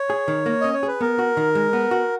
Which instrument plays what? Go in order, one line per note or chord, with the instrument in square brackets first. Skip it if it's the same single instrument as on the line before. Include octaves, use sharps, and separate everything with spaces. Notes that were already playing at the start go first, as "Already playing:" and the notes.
Already playing: [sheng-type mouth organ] C#5
[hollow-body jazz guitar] G#4
D#3
A#3
[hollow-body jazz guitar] C#4 [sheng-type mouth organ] D#5
[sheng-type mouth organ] C#5
[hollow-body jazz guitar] G#4 [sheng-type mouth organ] B4
[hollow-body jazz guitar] B3 [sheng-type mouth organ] A#4
[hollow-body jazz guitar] F#4
D#3
G#3
B3
F#4